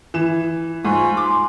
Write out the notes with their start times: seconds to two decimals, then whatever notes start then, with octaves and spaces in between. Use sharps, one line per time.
0.14 E3 E7
0.85 G#2 F4 G#5 C#6
1.17 C6 D6